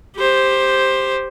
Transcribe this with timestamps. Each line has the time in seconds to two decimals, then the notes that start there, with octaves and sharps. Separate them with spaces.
0.16 G4 C5